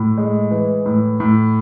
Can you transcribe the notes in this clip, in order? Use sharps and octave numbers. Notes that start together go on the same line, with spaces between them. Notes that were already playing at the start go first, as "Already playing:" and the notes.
Already playing: A2
G#3
E3
A2
A2